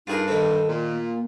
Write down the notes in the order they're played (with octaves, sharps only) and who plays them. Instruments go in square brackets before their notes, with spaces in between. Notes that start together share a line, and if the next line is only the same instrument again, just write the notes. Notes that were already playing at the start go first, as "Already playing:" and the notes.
[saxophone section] G2 [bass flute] D#4 [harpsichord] F4 G#4 A#4
[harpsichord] D#3 C4 [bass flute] A4
[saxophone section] A#2
[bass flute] A#3